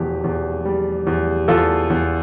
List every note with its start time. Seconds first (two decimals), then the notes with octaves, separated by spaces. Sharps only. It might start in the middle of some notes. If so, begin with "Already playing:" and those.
Already playing: F1 E2 B2 G4
0.24 E2
0.65 G3
1.07 E2
1.48 E2 F4 A4
1.90 E2